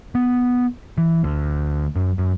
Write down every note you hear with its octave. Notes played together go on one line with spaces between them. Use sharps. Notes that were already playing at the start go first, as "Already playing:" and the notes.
B3
E3
D2
F#2
F#2